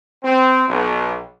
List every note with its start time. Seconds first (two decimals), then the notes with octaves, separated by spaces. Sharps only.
0.24 C4
0.68 B1